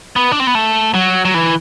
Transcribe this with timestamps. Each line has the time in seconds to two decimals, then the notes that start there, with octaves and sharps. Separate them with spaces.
0.16 B3
0.32 D4
0.40 C4
0.47 B3
0.55 A3
0.94 F#3
1.25 F#3
1.34 E3